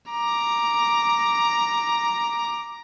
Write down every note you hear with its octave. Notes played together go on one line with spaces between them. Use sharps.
A#5 D6